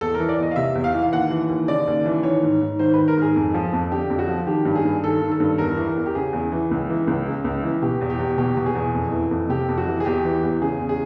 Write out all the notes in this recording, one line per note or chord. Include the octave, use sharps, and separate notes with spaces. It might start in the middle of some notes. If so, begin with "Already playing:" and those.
E2 A4
A#4
E3
D5
E2 D#5
F5
C3 E5
E2
F5
E3
F5
D#2 F#5
E3
D#2
C#3 D5
D#2
E3
D#3 C#5
G#2
G#2
D#3 C5
D#3 B4
A#4
G#2
G#4
F2
F3
F2
D3 G4
F2
F#4
F3
D#3 G4
G2
G#4
G2
D#3 A4
D#3
A4
G2
E2 A#4
E3
A#4
E2
G4
C#3 G#4
E2
E3
C#2
E3
C#2
C#3
C#2
E3
B2 G4
E2
G4
E2
B2 G4
B2
G#4
E2
F2
E3
F2
C3 G4
F2
F#4
E3
G#4
E2 G4
E3
E2
C#3 G#4
E2
G#4